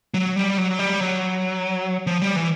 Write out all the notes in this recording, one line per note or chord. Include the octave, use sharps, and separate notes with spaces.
F#3
G3
F#3
G3
F#3
F3
G3
E3